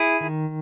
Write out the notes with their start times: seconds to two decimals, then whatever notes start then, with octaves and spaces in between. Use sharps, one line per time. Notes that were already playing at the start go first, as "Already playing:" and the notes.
Already playing: E4 G#4
0.21 D#3